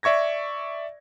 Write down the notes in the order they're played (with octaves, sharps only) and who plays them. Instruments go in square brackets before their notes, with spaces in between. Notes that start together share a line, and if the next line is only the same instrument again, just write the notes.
[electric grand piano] D5 E5 C#6 G#6 A#6